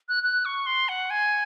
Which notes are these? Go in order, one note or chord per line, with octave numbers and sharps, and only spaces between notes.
F#6
F#6
C#6
C6
F#5
G#5